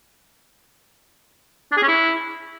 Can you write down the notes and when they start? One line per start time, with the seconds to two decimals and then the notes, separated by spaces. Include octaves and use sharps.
1.71 D4
1.77 G#4
1.83 C#4
1.88 E4